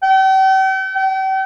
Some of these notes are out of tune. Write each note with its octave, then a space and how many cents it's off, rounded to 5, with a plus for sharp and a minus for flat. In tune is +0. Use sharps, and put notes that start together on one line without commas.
G5 -40
G5 -40